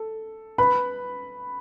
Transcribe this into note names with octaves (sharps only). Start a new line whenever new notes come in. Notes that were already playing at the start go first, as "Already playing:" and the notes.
Already playing: A4
B4 B5